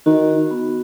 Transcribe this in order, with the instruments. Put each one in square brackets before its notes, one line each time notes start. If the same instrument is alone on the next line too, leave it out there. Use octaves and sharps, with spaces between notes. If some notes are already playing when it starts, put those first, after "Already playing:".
[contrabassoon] D#3 [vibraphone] F#4
[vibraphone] B3